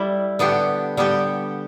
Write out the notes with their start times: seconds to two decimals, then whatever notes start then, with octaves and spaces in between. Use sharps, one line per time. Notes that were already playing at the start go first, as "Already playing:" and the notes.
Already playing: G3 E4 A4
0.39 D3 B3 D4 G4
0.97 D3 G3 B3 G4